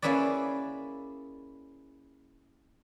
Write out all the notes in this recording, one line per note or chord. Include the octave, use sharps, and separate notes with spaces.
A#3 C#4 E4 G#4 B4 D5